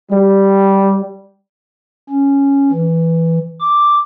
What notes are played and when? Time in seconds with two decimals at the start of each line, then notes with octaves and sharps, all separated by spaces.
0.12 G3
2.10 C#4
2.72 E3
3.61 D6